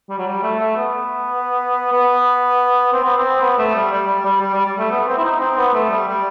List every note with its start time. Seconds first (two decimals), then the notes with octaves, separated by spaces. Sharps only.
0.10 G3
0.18 F#3
0.27 G3
0.43 A3
0.60 A3
0.77 B3
1.93 B3
2.92 C4
3.04 B3
3.17 C4
3.41 B3
3.58 A3
3.75 G3
3.92 G3
4.07 G3
4.25 G3
4.41 G3
4.54 G3
4.66 G3
4.78 A3
4.91 B3
5.07 C4
5.17 E4
5.24 D#4
5.40 C4
5.57 B3
5.73 A3
5.90 G3
6.07 G3